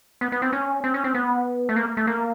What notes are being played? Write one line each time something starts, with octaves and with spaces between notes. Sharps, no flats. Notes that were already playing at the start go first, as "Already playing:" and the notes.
B3
B3
C4
C#4
C4
C#4
C4
B3
A3
A#3
A3
A#3